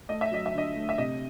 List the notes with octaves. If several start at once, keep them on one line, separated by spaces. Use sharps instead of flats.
A3 D#5
E5
F#3 D#5
E5
D3 D#5
A3
E5
C3 D#5